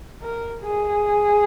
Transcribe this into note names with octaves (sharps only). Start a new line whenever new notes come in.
A#4
G#4